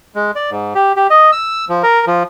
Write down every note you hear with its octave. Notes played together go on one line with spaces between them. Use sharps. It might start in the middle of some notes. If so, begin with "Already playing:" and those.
G#3
D5
G#2
G4
G4
D#5
E6
F3
A#4
F3